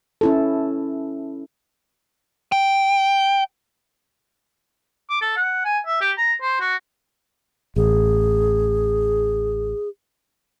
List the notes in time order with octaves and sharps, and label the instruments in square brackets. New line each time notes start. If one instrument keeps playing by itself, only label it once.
[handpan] C#4 E4 A4
[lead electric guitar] G5
[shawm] D6
A4
F#5
G#5
E5
G4
A#5
C5
F#4
[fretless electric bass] A1 [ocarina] G#4